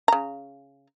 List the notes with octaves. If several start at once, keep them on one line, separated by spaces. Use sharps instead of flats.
C#3 A#5